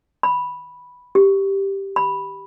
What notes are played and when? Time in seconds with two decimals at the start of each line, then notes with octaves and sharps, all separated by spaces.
0.23 B5
1.15 G4
1.96 B5